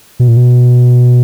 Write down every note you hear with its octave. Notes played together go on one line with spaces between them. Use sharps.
B2
A#2
B2